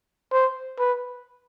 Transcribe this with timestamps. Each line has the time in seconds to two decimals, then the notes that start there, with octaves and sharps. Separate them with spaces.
0.32 C5
0.79 B4